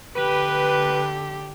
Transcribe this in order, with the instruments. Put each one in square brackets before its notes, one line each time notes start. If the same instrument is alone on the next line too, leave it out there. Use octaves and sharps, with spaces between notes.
[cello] D3 G4 [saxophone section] B4